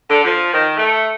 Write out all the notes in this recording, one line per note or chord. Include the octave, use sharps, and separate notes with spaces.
D3
F3
D#3
A3